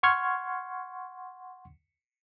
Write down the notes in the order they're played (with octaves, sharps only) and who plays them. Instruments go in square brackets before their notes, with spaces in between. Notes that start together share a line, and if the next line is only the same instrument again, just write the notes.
[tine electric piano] F#5 C6 C#6 F6 G#6